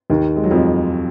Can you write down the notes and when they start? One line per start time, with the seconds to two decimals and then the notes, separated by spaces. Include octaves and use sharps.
0.10 D#2 D#3
0.36 G#3
0.44 F#3
0.51 F2 F3